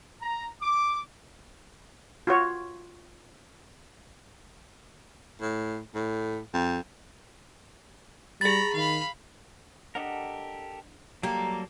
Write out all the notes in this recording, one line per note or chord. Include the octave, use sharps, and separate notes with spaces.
A#5
D6
F4 F#4 C#5
A2
A2
F2
G3 G#4 A#5 B5 A6
D#3 F5 B5
D4 G4 A4 A#4 D#5 F#5
F#3 G3 A#3 G4 A4